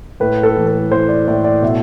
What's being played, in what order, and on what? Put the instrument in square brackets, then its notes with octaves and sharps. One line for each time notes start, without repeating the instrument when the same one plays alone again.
[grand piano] A2 B4
A4
E3
A4
E3 C5
D5
A2 D5
D5
B2 E5